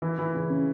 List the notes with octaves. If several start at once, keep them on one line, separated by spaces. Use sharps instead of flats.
E3 E4
E3 E4
C#3 C#4
C#3 C#4